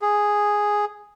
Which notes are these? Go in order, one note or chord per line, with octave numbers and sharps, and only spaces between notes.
G#4